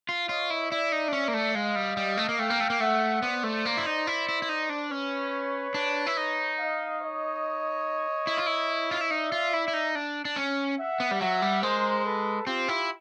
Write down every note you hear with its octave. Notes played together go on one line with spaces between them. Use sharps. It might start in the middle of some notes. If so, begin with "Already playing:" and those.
F4
F4 C#5 D#5
E4
E4 D5 E5
D#4
D4
C#4
A#3
A3
G#3 D#5 F5
G3
G3
A3
A#3
A3 F5 G5
A#3
A3
A#3
A3 E5 F#5
B3 C5 D5
A3
A#3
E4
D#4
E4
E4
E4
D#4
D4
C#4 B4 C#5
D4
E4
D#4
D#5 F5
C#5 D#5
E4
F4
E4
F4
E4
D#4 D5 E5
F4
E4
E4
D#4
D4
D4
C#4
E5 F#5
B3
G3
F#3 E5 F#5
G3
G#3 A#4 C5
A4 B4
C4 F4 G4
E4